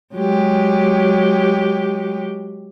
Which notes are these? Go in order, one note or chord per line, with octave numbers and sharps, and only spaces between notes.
F#3 G#3 G4